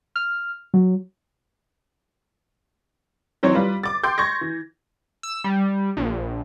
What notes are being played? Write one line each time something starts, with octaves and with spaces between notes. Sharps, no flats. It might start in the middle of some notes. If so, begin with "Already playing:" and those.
F6
F#3
E3 F#3 C4 D#4 C#5
G3 F4 B4
D6 A6
G5 C6 D6 G6
C6 C#6 G#6 A#6
E3
E6
G3
A#1